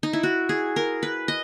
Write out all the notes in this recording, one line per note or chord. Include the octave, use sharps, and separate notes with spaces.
D#4
E4
F#4
G#4
A#4
B4
D#5